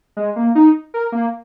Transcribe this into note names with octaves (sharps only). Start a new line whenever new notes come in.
G#3
A#3
D#4
A#4
A#3